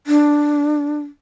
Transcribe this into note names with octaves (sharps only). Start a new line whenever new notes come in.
D4